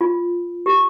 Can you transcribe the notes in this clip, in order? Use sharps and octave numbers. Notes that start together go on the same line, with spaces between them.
F4
G4